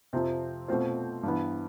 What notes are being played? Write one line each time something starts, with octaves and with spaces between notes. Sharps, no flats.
F2 C3 F3 C4
B2 A3 C4 F4 C5
G2 E3 B3